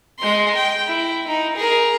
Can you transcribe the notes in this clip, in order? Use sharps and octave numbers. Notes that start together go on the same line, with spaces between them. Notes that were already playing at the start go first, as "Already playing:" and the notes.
G#3 C6
G5
E4
D#4
G#4 A#4